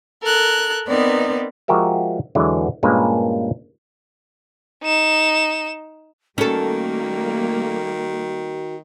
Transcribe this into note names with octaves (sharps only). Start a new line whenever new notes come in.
A4 A#4 F#6
B3 C4 D#4 A#4 B4 D5
F3 G#3 F#4 G4 A#4 E5
E2 D3 E3 F#3 G#3 B3
G2 A#2 G#3 A#3 C#4 B4
D#4 E7
D#3 G3 A3 A#3 C#4 F#4 A4